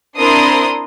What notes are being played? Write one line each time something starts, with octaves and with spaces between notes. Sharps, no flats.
C4 D4 E4 A#4 C6 D#6